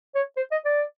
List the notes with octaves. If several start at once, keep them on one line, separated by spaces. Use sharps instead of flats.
C#5
C5
D#5
D5